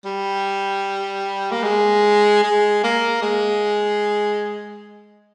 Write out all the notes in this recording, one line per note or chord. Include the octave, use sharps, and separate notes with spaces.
G3
A#3
G#3
G#3
A#3
G#3